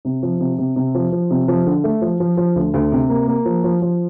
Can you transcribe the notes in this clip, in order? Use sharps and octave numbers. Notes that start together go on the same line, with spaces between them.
C3
F3
C3
C3
C3
F3
F3
C3
F3
D3
A3
F3
F3
F3
D2
D2
C3
A#3
A#3
F3
F3
F3